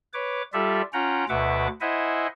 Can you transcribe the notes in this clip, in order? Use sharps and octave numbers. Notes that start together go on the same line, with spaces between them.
B4 C#5 D6
G3 F4 G4 A4 D5 E5
C#4 F4 F#5 G5 A#5
D2 B2 B4 E5 F#5 D6
E4 C5 D#5 E5 F#5 G#5